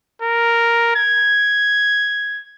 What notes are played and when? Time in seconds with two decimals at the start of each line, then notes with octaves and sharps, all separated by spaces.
0.22 A#4
0.96 G#6